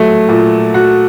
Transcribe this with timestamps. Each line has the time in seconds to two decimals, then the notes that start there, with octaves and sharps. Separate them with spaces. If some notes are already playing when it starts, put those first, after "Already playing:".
Already playing: F#3 A3
0.29 A#2
0.74 F#4